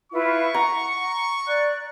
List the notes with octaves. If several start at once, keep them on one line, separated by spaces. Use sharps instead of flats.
E4 F4 B4 C#6
F#5 A#5
D5 F#6